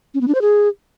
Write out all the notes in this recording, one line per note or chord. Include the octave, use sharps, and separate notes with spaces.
C#4
B3
D4
C5
G#4